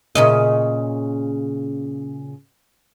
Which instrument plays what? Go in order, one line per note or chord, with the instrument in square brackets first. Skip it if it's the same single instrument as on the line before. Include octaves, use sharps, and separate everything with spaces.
[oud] A#2 C#3 D#5